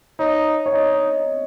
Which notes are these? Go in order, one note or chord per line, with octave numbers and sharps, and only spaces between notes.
D#4 C#5
C#5
D#4 D#5